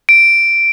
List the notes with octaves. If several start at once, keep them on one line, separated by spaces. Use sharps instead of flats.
D7